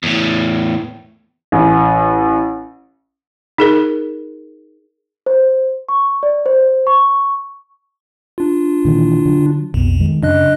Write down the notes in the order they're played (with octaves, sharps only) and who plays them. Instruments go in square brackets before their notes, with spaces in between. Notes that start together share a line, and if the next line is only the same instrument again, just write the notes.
[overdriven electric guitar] E2 A2
[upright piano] A1
[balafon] D#4 G#4 A#4
[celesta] C5
C#6
D5
C5
C#6
[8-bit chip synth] D4 F4
[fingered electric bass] A#2 D#3 E3
D3 F#3
[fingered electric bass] B1 B2 [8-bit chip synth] F2
[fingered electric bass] D#3 G#3
[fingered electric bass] F#2 C#3 [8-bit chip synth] D4 D#5 F#6